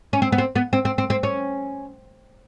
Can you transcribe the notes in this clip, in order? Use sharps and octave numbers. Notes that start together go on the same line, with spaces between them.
C#4
C4
B3
C4
B3
C4
C4
C4
C4
C#4